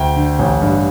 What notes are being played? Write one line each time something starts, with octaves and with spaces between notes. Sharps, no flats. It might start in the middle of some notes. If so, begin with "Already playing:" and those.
Already playing: D2 G5
D3
A1
G2